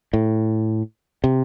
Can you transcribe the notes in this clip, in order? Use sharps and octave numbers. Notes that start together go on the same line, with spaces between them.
A2
C3